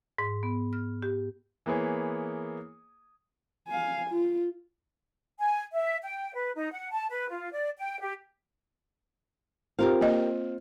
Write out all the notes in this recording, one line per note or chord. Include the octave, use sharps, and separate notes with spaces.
G#2
B3
F6
G4
E3 A#3 B3 G#4 C#5
F5 G#5
F4
G#5
E5
G5
B4
D#4
F#5
A5
B4
F4
D5
G5
G4
C4 F4 G4 A#4 F5
A#3 D#5